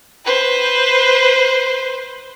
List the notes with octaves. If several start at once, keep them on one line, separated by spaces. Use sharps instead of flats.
B4 C5